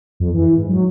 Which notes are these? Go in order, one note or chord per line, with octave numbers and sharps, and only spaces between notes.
F2
E3
G#2
F#3